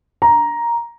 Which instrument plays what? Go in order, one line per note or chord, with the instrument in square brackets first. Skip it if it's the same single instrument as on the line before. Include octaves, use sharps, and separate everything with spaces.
[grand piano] A#5